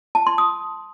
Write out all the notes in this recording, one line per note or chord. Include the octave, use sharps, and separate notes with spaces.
A5
C6
D#6